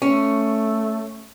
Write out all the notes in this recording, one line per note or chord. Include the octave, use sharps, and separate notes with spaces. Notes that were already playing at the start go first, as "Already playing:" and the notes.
A3 C#4